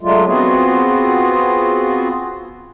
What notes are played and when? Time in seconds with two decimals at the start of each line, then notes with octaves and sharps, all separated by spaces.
0.01 D3 F#3 G#3 A3 D4 F4
0.27 B3 C4 F4 F#4 G#4